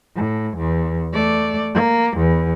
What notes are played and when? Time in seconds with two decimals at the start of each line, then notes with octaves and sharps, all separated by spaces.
0.16 A2
0.57 E2
1.13 A3 D5
1.74 A#3
2.17 E2